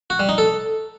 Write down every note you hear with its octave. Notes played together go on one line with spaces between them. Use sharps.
F#4
G3
D#4
A4